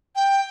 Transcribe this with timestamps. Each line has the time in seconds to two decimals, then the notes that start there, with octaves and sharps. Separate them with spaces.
0.16 G5